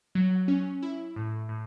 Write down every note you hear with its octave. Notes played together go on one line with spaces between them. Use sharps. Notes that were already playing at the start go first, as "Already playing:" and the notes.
F#3
C#4
E4
A2
A2